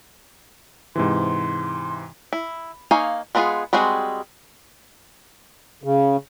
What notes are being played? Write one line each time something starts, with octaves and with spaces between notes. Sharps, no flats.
G#2 C3 E3 C6
E4
A#3 D#4 C#5 F5 G#5
G#3 B3 D4 F4 G#4
G3 G#3 C4 F#4 G#4
C#3